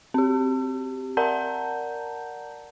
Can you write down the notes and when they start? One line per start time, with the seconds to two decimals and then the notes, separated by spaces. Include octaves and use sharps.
0.14 C4 G4
1.17 A#4 D5 F#5 A5 A#5 G6